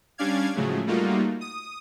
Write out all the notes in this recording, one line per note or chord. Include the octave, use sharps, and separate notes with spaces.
G3 C#4 D4 D5 F5 G#6
A2 C#3 F3 F#3 G#3 A3
G3 A3 A#3 D#4 F4 F#4
D#6